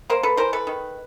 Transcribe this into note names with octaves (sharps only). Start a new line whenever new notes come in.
A#3 A#4 C5
A4 B4
E3 A#4 C5
A4 B4
D#3